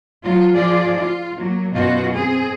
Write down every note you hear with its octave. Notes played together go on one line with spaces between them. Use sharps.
F#3 F4
F3 F4 G#4 D5
F4
F#3 A#3
F#2 B2 B3 F4 F#4
C4 G#4